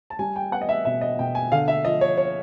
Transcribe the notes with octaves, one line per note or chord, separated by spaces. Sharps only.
A5
G3 G#5
G5
B3 F#5
D#5
E5
B2 E5
D#5
B2 G5
G#5
D3 F5
E5
F3 D#5
C#5
C#5